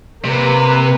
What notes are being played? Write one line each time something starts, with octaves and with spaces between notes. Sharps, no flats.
C3 A#3 B4